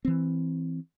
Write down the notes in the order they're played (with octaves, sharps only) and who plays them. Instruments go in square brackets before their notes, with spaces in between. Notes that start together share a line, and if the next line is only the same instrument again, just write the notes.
[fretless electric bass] E3 C4